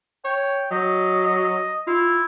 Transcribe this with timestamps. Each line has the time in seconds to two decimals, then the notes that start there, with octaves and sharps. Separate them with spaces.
0.25 C#5 G5
0.71 F#3 D#5
1.26 D#5
1.87 E4 F4